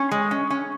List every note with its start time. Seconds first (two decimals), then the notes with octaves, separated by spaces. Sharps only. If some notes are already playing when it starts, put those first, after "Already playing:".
Already playing: C#4
0.11 G#3
0.31 C#4
0.50 C#4